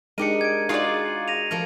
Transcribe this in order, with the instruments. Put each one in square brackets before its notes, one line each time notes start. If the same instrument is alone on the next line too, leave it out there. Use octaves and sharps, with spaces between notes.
[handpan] G#3 D#4 [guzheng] D4 G4 A#4 [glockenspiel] C#7 D#7
[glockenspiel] G#6 D7
[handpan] D#4 [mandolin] F4 D5 [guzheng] F#4 G#4 F5
[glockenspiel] A#6 D#7 F7
[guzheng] F3 A3 A#4